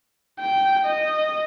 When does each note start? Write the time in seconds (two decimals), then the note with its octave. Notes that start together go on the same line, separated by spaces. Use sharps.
0.40 G5
0.85 D#5